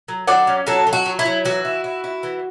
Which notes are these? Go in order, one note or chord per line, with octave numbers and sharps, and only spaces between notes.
F#3
F#3 D5 F#5
C#4
F#3 F#4 A4
F#3
F#4
F#3
E4
F#3
E3 F#4
E4
E4
E4
E3